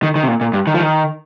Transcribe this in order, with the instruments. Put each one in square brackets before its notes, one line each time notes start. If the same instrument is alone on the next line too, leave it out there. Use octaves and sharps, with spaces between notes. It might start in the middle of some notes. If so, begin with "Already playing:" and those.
[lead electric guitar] D#3
D#3
C3
A#2
A#2
G2
D#3
F3
D#3